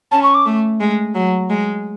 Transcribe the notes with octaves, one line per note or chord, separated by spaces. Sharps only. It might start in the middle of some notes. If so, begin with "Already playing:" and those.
C#4 A5
C#6
D6
A3
G#3
F#3
G#3